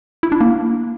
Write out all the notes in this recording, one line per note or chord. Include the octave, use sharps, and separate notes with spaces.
E4
D4
A#3